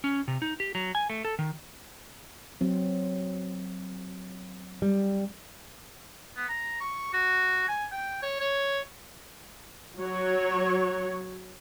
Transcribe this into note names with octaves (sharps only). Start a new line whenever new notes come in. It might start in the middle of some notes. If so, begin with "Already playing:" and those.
C#4
C3
D#4
G4
F#3
G#5
A3
A4
D#3
F#3 C4
G3
B3
A#5
C#6
F#4
G#5
G5
C#5
C#5
F#3 C#5